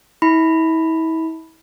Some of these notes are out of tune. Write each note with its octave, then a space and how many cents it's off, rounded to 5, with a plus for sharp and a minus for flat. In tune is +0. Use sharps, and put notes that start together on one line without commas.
E4 -40 B5 +0